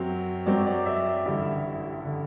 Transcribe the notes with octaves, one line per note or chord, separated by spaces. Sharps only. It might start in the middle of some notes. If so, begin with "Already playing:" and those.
Already playing: F#2 F#3 C4
F#2 F#3 C4 D5
D5
E5
D5
A1 G2 D3 E5
D3